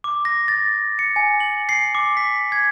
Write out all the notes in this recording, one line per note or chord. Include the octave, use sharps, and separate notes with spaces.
D6
A#6
A6
C#7
G#5
F#7
C7
D6
B6
G#6